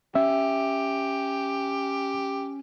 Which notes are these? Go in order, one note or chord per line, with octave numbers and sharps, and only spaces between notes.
C#4 G4 E5